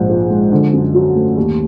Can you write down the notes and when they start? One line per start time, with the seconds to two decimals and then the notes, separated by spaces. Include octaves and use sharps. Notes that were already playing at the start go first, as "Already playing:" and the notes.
Already playing: A#1 G#2
0.09 F3
0.30 G#3
0.52 D3
0.73 F#2
0.95 F#3
1.16 A3
1.37 D#2